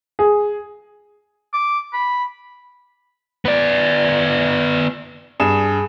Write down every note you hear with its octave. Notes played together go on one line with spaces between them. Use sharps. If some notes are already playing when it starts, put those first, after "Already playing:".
G#4
D6
B5
B3 D5
G2 G#4 E7